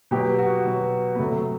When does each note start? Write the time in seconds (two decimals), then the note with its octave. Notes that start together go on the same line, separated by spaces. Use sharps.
0.11 B2 F#3 G4
0.39 F#4
0.65 B2 F#3
1.15 B3
1.19 C3 F#3 A3